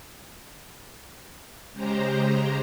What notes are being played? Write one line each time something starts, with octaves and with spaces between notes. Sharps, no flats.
C#3 G#3 G4 C5 A#5